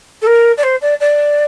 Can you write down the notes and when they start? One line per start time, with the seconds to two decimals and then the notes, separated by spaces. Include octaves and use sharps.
0.22 A4
0.27 A#4
0.57 D5
0.63 C5
0.82 D5
1.00 D5